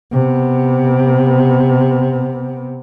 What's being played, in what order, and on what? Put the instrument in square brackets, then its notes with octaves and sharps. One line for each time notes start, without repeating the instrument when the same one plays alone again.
[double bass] C3 B3